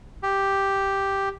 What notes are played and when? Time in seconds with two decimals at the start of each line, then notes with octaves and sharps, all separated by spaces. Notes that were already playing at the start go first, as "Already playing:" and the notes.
0.23 G4